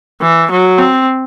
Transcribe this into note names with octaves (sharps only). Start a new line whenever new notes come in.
E3
F#3
C4